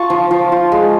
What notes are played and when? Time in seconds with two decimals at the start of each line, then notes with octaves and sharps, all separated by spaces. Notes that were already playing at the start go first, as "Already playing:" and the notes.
Already playing: F4 A5 C#6
0.10 F3
0.31 F3
0.52 F4
0.72 G#3